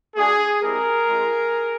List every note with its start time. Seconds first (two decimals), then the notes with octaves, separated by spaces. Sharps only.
0.16 A3 D4 F#4 G#4
0.62 G#3 C4 E4 G4 G#4 A#4
1.07 G#3 C4 F4